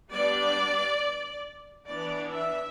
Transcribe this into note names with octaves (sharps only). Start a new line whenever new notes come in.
G3 B3 D4 D5
E3 B3 D4 D5
E5